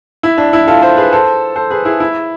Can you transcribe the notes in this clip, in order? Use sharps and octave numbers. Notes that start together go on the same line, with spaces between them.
E4
D4
E4
F4 A4
A4 C5
G#4 B4
A4 C5
A4 C5
G#4 B4
E4 G#4
E4